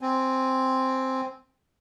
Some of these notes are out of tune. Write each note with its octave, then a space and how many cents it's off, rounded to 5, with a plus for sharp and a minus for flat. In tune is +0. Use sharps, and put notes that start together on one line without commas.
C4 +0 G#5 +0